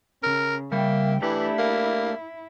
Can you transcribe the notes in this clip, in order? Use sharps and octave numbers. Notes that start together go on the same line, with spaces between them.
C#3 A#4
C#3 G3 A#3 E5 G5
E3 A3 D4 E4 G4
A#3